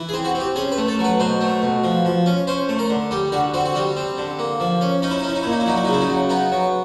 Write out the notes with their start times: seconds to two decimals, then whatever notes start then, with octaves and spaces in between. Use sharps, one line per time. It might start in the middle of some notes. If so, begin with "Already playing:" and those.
Already playing: E3
0.09 G#4
0.14 C4
0.25 F#4
0.35 C4
0.40 G4
0.56 C#4 G#4
0.72 B4
0.78 A3
0.88 A4
0.99 F#3
1.04 B4
1.20 B2 C5
1.41 A3
1.62 B2
1.84 F3
2.05 F3
2.26 C#4
2.47 C#4 C5
2.69 A3
2.79 A#4
2.90 D3
3.11 G3 G4
3.32 D3 F#4
3.54 C4 F#4
3.65 F#4
3.75 G3 G4
3.97 C4
4.18 D3
4.39 A#3
4.60 F3
4.81 C#4
5.02 C#4 D#4
5.11 E4
5.19 D#4
5.23 C#4 E4
5.35 D#4
5.43 A#2 E4
5.52 D#4
5.60 E4
5.66 F#3 D#4
5.76 E4
5.85 C#3 D#4
5.93 E4
6.01 D#4
6.09 F#3
6.30 B3 D#4
6.52 F#3